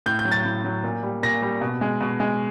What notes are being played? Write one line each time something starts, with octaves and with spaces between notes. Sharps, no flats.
A2 G6
G6
F#3
A6
A2
F#3
A#2
G3
A#2 A#6
G3
B2
G#3
B2
G#3